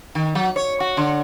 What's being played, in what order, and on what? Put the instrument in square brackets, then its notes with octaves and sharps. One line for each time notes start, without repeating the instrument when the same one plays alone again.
[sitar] D#3
F#3
C#5
F#4
D3